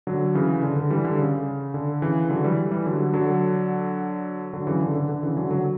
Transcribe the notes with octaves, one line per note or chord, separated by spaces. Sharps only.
D3 F#3
C#3 E3
D3
D3
E3 G3
D3
C#3
D3
C#3 E3
D3 F#3
E3 G3
E3 G3
D3 F#3
D3 F#3
D3 F#3
C#3 E3
D3
D3
D3
C#3 E3
D3 F#3
D3 F#3